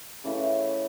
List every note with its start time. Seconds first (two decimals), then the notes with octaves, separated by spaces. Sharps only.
0.24 C#3 E3 A3